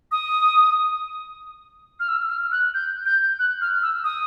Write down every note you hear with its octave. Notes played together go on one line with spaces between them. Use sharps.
D#6
F6
E6
F6
F#6
G6
G6
F#6
F6
E6
D#6